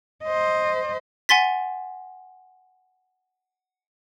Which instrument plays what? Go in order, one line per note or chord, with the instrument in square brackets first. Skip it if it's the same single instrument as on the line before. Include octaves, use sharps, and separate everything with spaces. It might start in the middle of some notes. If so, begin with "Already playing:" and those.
[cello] C5 D#5
[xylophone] F#5 G#5 C6 A6 B6